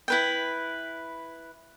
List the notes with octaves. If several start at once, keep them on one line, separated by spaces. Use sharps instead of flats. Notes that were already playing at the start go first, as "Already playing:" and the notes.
E4 B4 G5